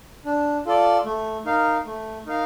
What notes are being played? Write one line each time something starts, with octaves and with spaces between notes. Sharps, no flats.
D4
F4 A4 D5
A3
D#4 A#4 F5
A3
D#4 A#4 F5